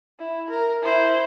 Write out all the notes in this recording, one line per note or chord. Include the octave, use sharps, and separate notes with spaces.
E4
A#4
E4 C5